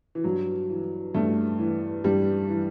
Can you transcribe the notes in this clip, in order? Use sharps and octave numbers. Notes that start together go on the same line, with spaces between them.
E3
G2 F#3
E3
G2 A3
E3
G2 G3
E3